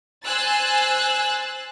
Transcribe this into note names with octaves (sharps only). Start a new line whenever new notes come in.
C5 G#5 E6 F#6 A6